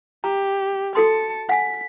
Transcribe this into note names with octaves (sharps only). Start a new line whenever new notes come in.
G4 A#5
F#4 A4 A5 C6 C#7
F#5 G#5 B6